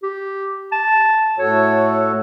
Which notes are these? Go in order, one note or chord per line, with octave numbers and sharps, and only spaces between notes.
G4
A5
A2 F#4 A4 C#5